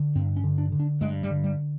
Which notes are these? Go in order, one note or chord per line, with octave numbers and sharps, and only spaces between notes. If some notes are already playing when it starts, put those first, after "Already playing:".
Already playing: D3
G2 C4
C#4
D3
D4
D3
D4
G2 G#3
G3
D3
G3